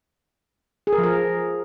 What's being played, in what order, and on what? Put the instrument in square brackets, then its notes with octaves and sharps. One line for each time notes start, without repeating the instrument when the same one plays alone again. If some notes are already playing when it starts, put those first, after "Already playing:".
[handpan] G#4
A#4
F3
A#4